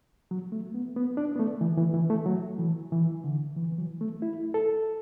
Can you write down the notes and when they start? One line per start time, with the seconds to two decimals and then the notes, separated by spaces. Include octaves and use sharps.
0.31 F#3
0.52 A3
0.74 B3
0.96 B3
1.17 D4
1.36 B3
1.40 A3
1.61 E3
1.77 E3
1.94 E3
2.10 A3
2.26 F#3
2.59 E3
2.92 E3
3.24 D3
3.57 E3
3.72 E3
3.78 F#3
4.01 A3
4.22 E4
4.54 A4